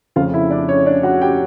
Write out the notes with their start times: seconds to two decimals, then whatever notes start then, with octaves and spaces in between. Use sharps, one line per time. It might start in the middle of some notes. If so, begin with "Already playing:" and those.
0.16 F2 C#3 F3 A3 F4 F5
0.34 E4 E5
0.51 D4 D5
0.68 C#4 C#5
0.86 D4 D5
1.03 F#4 F#5
1.22 G4 G5